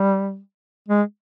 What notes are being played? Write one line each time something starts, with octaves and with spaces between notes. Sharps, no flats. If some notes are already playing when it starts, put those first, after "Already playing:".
Already playing: G3
G#3